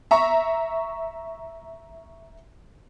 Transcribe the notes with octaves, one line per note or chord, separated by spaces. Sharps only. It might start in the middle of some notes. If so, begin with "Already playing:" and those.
E5 A#5 C#6